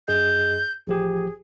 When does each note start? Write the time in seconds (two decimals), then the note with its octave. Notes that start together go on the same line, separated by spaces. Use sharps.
0.08 F#2 G#4 D#5 G6
0.87 A1 F3 G4 G#4